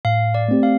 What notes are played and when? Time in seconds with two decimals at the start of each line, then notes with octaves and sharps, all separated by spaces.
0.05 A2 F5
0.34 D5
0.48 A3 C4 G4
0.63 F5